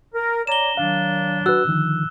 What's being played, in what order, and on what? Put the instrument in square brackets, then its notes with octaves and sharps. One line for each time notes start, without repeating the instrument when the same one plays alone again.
[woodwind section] A#4
[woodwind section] C#5 D5 A#5 [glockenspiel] E7 G7
[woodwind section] D#3 F#3 D4 [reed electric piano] F5
[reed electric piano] F#4 B4 [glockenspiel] E6 F#6
[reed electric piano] D3 D#3 F3